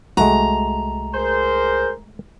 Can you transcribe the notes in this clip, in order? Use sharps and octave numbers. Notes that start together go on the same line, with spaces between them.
C2 G#3 A3 F#4 A#5
G#4 A#4 C5